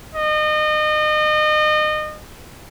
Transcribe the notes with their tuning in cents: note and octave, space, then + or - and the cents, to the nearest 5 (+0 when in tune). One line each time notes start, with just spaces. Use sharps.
D#5 -30